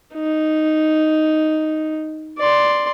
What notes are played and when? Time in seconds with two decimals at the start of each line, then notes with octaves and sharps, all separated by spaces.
0.15 D#4
2.39 D5 C6